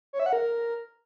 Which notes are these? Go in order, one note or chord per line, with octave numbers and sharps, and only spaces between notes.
C#5
E5
F#5
A#4